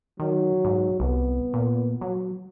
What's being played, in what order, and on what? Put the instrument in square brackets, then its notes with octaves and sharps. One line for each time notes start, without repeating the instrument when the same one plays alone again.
[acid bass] D#3 [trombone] F#3
[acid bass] G#2
[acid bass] C2 [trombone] B3
[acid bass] A#2
F#3